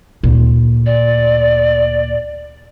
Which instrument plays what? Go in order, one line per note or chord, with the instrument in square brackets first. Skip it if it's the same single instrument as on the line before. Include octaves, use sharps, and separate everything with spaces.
[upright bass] D2 A#2
[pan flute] D5